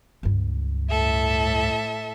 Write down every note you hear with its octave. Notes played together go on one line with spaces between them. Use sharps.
C#2 G2
A2 A4 E5